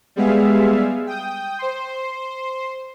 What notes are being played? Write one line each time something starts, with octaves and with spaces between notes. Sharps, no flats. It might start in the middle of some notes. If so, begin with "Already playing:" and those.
G3 G#3 B3 G#4 E5 F5
G5 D#6 G6
C5 C6